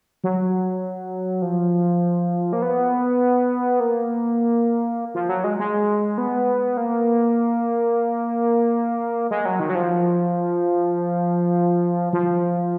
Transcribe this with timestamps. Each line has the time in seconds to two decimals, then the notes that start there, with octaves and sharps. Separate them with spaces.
0.24 F#3
1.42 F3
2.53 A#3
2.62 B3
3.80 A#3
5.14 F3
5.29 F#3
5.44 G#3
5.59 G#3
6.18 B3
6.77 A#3
9.31 G#3
9.45 F#3
9.60 D#3
9.69 F#3
9.75 F3
12.13 F3